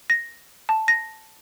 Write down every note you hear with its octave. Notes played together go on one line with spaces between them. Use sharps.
A#6
A5
A#6